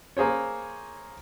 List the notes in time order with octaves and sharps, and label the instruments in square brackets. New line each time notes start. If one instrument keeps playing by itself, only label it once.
[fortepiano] A#3 G#4 C5 C#5